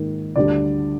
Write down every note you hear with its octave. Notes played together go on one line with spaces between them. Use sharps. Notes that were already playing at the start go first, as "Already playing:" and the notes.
Already playing: G#2 D#3 A#3
D2 D3 G3 D4 D5